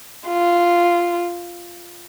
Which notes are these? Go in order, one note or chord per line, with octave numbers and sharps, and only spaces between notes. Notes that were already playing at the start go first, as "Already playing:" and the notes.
F4